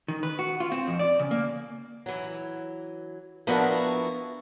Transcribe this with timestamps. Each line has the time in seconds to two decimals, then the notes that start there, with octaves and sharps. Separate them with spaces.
0.08 D#3
0.23 B4
0.39 F#4
0.60 F4
0.72 C4
0.87 F2
0.99 D5
1.19 C#3
1.31 A#3
2.06 E3 F#3
3.47 F3 B3 D4 E4 F#4 A#4